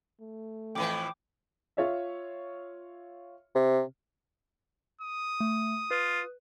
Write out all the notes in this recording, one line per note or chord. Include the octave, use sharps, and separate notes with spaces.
A3
F2 A2 E3 G5 D6
F4 C#5 E5
C3
D#6
A3
F4 B4